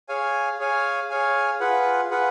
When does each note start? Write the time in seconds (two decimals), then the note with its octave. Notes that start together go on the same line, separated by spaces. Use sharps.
0.09 G#4 C#5 F5 G#5
0.59 G#4 C#5 F5 G#5
1.10 G#4 C#5 F5 G#5
1.60 F4 G#4 B4 F#5
2.11 F4 G#4 B4 F#5